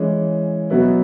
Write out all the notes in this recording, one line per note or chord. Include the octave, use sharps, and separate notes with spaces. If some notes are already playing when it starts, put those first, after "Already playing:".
Already playing: E3 G#3 C#4
B2 F#3 B3 E4